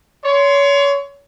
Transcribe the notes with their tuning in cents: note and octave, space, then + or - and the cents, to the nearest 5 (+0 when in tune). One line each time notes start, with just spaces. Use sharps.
C#5 +30 C6 -5